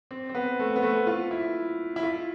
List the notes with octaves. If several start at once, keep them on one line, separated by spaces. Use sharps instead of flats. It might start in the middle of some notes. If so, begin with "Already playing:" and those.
C4
C4
B3
A3
B3
A3
F4
E4
E4
F4